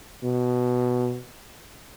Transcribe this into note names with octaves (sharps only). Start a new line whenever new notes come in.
B2